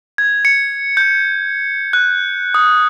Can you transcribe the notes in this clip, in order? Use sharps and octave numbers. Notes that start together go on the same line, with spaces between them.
G#6
C#7
G6
F#6
D#6